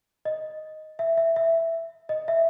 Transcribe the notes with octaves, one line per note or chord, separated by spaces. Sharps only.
D#5
E5
E5
E5
D#5
E5